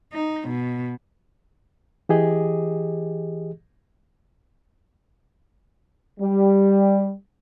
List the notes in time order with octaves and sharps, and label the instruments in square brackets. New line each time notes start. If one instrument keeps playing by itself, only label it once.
[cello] D#4
B2
[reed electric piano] E3 G4 G#4 D#5
[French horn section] G3